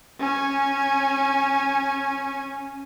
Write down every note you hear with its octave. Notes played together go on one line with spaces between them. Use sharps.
C#4 G#5